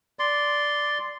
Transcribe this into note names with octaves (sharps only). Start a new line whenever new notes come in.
D5 C6